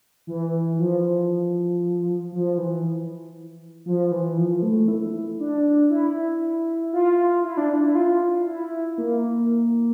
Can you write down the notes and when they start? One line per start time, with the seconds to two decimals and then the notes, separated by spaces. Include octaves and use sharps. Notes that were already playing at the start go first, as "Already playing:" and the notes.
0.27 E3
0.79 F3
2.32 F3
2.58 E3
3.86 F3
4.11 E3
4.37 F3
4.63 A3
4.88 E4
5.39 D4
5.90 E4
6.93 F4
7.44 E4
7.57 D4
7.83 E4
7.95 F4
8.47 E4
8.98 A#3